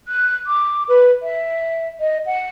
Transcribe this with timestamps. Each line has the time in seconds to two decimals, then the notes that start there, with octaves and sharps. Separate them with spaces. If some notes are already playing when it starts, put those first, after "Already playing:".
0.08 F#6
0.47 D6
0.89 B4
1.23 E5
2.00 D#5
2.26 F#5